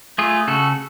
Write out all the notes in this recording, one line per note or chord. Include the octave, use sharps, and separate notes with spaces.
A3 F4 G#4
C#3 F#4 A4